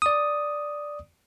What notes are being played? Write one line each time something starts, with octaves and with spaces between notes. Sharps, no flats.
D5 D#6